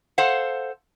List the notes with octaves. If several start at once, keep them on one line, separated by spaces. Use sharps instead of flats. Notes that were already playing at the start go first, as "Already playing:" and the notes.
A4 C5 F5 F#5